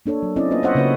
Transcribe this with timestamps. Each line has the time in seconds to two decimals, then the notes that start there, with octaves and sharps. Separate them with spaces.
0.06 A#3 D4 A4 C#5
0.23 F#3
0.36 C4 C#4 E4 D5 D#5
0.51 A#3 B3 F4 B4 D#5
0.63 C5 C#5 D#5 E5 F#5
0.75 C#3 A#3 C#4 F#4 B4 C#5